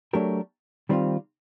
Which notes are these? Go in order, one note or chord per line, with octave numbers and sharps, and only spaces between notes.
F#3 A3 D4 G4 A#4
D#3 G3 C4 F4